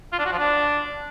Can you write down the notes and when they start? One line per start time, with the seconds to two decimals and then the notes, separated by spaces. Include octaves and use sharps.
0.13 F4
0.19 D4
0.26 F#4
0.32 F3
0.39 D4